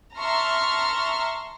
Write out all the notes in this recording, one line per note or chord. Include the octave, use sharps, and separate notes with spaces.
E5 A5 A#5 C6 C#6 F6